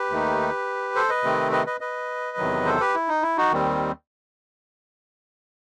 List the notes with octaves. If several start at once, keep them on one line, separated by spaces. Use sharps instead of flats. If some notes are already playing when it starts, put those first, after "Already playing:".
Already playing: G4 B4
D#2 D#3 A3 D#4
A4 C5
B4 D#5
C3 D#3 A3 C4
B4 D#5
B4 D#5
B4 D#5
E2 C3 D#3 F#3
A4 C5
G4 B4
E4
D#4
E4
D#4 F#4
D#2 D#3 G3 C4